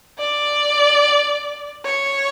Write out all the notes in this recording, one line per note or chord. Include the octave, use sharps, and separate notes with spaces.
D5
C#5